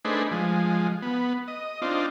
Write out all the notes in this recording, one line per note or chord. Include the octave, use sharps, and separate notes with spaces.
A3 D4 D#4 G#4 B4 C5
F3 G#3
B3
D#5
C4 D4 D#4 F4